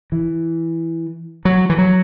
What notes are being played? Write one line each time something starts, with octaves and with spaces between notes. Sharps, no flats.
E3
F#3
E3
F#3